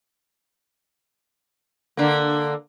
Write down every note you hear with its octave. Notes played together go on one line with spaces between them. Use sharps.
D3 A#3